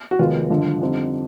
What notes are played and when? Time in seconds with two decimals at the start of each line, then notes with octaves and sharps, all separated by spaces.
0.11 F#4
0.19 F1 D#2 D#3 G#3 B3 F4
0.50 G#1 G2 D3 F3
0.81 F2 D3 G3 C4 D#4